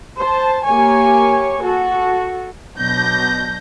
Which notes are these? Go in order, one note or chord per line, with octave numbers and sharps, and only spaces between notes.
C5 A5
A#3 G4 C#5 G#5
F#4 A4
B2 F#3 D4 G6 A#6